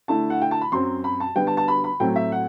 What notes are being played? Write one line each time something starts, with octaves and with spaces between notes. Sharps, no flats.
D3 A3 E4 A5
F#5
G5
A5
B5
F#2 F#3 C4 C6
B5
A5
D3 G3 B3 G5
A5
A5
B5
B5
A2 F#3 A3 C4 G5
E5
F#5